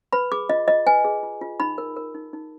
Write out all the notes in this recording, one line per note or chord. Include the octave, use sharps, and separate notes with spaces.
B4 B5
G#4 D6
F4 D#5
F4 D#5
B4 G#5
G#4
F4
F4
D#4 B5
A#4
A#4
D#4
D#4